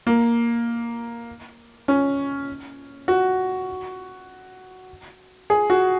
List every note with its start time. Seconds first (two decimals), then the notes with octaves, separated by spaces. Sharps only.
0.07 A#3
1.88 C#4
3.08 F#4
5.50 G#4
5.70 F#4